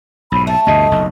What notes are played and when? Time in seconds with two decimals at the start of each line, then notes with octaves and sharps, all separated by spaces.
0.32 B1 G#2 B5
0.47 A3 A5
0.67 D2 G2 B2 D#5
0.91 F#1 B1